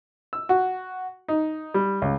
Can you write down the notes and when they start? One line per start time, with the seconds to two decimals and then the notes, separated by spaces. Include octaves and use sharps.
0.33 E6
0.49 F#4
1.28 D#4
1.74 G3
2.02 C#2